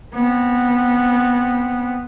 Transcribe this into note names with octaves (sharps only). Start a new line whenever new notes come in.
B3 C4